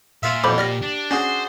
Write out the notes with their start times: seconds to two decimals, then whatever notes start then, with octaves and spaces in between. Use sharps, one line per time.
0.23 A#2 F4 C5 E5
0.44 B1 F2 E3 C5 B5 D6
0.58 G4 D5 F6 A#6
0.82 D4
1.11 C#4 D4 F#4 G#4 C5